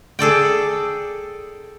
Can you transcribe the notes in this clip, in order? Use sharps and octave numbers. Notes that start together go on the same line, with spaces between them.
G#4 A4 D5 G5